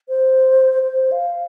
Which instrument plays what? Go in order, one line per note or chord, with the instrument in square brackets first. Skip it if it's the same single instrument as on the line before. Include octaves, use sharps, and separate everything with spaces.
[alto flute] C5
C5
F5